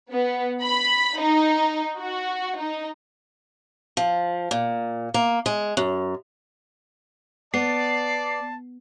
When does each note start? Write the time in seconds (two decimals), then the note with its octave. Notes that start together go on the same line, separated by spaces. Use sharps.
0.11 B3
0.63 B5
1.21 D#4
2.01 F#4
2.60 D#4
3.97 F3
4.51 A#2
5.14 A#3
5.46 G#3
5.77 F#2
7.54 B3 D5 A5 C7